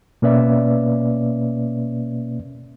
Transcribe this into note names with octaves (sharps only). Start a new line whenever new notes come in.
B2 A#3 C#4 B4 D5 E5